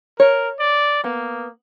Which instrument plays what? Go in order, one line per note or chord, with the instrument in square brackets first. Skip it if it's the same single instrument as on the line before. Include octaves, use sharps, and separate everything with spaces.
[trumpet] A#4 [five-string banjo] C#5
[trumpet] D5
[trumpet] A#3 [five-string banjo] B3